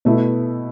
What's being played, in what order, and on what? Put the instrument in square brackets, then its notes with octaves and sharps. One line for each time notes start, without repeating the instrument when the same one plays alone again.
[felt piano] B2 A3 E4